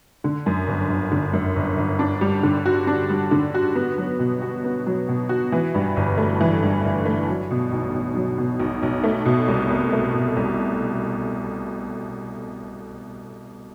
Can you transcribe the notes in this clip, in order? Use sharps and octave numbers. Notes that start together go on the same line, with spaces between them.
D3
F#2
G1
G1
D3
F#2
G1
G1
D4
G3
D3
F#4
D4
G3
D3
F#4
B3
F#3
B2
F#4
B3
F#3
B2
F#4
E3
G2
G1
A3
E3
G2
G1
A3
F#3
B2
B1
B1
F#3
B2
B1
B1
A3
B2
C2
C2
A3
B2
C2